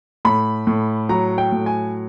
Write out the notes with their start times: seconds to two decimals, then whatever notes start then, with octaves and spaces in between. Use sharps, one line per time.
0.25 A2 B5
0.67 A2
1.09 F#3 A#5
1.38 G5
1.52 A2
1.66 G#5